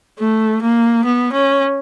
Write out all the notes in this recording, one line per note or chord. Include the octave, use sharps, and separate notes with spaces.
A3
A#3
B3
C#4